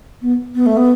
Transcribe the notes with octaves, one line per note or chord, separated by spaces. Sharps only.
B3
B3
A3
B3